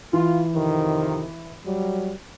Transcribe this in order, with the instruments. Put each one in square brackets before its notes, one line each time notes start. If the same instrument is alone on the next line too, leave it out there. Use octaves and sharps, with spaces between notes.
[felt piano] E3 [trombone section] F4
[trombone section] F2 C3 D#3
F#3 G3